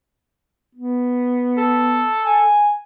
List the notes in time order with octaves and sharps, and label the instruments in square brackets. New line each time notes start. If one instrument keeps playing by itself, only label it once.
[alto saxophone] B3
[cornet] A4
[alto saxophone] G#5